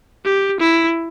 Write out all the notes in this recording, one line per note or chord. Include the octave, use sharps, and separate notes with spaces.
G4
E4